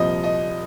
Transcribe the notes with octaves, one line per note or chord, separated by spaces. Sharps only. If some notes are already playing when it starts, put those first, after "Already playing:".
Already playing: C2 A#2 F3 D#5
D#5